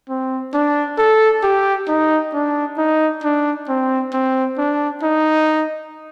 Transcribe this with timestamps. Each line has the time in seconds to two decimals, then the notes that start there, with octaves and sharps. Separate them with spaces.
0.09 C4
0.54 D4
0.98 A4
1.43 G4
1.88 D#4
2.34 D4
2.78 D#4
3.24 D4
3.68 C4
4.13 C4
4.58 D4
5.03 D#4